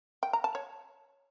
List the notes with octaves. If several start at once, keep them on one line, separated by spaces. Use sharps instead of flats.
G5
A#5
A5
C#5